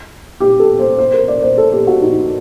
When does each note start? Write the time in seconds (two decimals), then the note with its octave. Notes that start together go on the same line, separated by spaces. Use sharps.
0.40 G4
0.60 A4
0.79 C5
0.99 C5
1.13 A#4
1.28 D5
1.43 C5
1.58 A4
1.72 G4
1.87 F#4
2.02 D#4